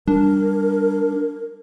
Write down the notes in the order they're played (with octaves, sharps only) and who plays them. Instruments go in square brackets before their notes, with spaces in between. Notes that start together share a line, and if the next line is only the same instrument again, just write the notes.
[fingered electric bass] G3 [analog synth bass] D4 [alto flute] A#4